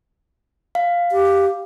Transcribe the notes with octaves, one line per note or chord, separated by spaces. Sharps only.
F5
G4